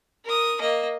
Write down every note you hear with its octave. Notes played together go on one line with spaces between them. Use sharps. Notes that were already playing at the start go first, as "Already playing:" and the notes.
A#4 D#6
A#3 D#5